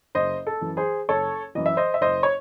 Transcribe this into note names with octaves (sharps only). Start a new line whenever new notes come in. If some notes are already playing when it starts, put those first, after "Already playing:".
F#1 C5 D#5
A4
F#2 E3
G#4 C5
F#1 A4 C#5
F#2 E3 D#5
E5
C5 D#5
E5
F#1 C5 D#5
C#5